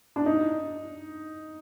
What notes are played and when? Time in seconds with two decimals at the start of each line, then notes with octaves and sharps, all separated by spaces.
0.16 D4
0.26 D#4